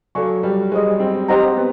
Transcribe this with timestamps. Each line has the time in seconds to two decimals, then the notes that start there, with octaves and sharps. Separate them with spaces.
0.15 F#3 A4 D5 F5 G#5 C#6
0.43 G3
0.72 G#3 G#4 C5 D#5
1.00 C4
1.29 C4 G4 C5 D#5 F#5 A#5
1.57 B3